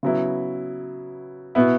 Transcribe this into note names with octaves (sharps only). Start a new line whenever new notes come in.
C#3 F#3 B3 E4
B2 B3 E4